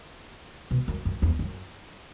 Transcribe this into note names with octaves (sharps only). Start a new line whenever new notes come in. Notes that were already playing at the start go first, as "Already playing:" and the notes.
B2
F#2
F#2
E2
F#2